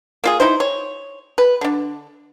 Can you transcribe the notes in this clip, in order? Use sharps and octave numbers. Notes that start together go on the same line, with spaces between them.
A#3 F4 G#4
D#4 E4 C5
C#5
B4
D3 D4